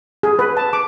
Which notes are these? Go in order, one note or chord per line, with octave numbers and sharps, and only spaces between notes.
G#4
B4
A5
D6